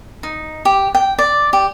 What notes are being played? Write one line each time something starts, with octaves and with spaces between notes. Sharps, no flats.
D#4
G4
G5
D5
G4